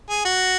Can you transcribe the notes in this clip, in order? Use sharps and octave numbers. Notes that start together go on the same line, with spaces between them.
G#4
F#4